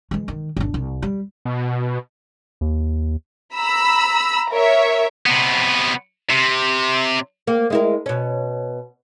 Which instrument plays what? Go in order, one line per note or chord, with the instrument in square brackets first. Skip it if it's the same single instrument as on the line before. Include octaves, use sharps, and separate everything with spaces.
[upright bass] E3 G#3
D#3
G#1 D4
C2
G3
[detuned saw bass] B2
[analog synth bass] D#2
[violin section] A#5 B5 E6
A#4 C#5 E5
[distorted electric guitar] C3 B3
C3
[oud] A#3
G#3 E4 A#4
B2 C#4